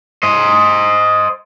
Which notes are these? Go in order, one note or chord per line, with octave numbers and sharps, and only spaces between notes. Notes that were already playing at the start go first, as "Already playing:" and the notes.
C5 D#5